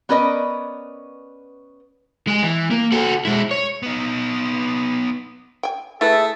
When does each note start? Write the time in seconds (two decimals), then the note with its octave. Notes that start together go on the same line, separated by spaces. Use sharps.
0.09 B3 C#4 A#4 B4 D5 D#5
2.28 G#3 G#4
2.43 E3
2.71 A#3
2.92 F#4 A4
3.25 G#3 E4
3.51 C#5
3.83 B3 D#4
5.63 G5 G#5
6.01 A3 E4 G#4 B4 E5 G#5 A5